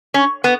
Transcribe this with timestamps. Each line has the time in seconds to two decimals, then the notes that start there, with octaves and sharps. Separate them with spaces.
0.14 C#4
0.44 B3